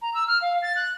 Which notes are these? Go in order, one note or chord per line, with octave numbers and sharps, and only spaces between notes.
A#5
E6
F6
F5
A6
F#6